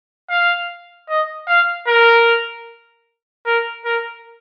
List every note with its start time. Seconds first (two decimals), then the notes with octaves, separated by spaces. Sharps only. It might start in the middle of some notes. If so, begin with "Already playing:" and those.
0.30 F5
1.09 D#5
1.48 F5
1.87 A#4
3.46 A#4
3.85 A#4